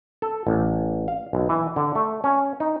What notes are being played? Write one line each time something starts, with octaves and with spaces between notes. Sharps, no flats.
A4
A1
F5
B1
E3
D3
A3
C#4
D#4